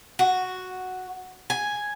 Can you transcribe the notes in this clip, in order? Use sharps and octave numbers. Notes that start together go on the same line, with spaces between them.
F#4
G#5